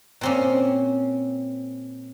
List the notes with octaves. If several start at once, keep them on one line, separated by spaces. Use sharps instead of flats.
A#2 C4 C#4